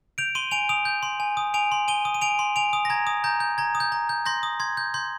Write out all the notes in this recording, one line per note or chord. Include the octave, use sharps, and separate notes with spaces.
G6 D7 F7
C6 D#7 G7
G#5 D7 F7
D#6 D7 F7
G6
C6
G#5
D#6
G#5 D7 F7
C6
G#5 D#7 G7
D#6
D#7
G#5 D7 F7
C6
G#5 D7 F7
D#6
A#6
A#5 G#6
D#6
A#5 G6
G6
A#5 G#6
D#6
G6
A#5
G6
C6 G6 A#6
D#6
C6 G#6
G6
C6 G6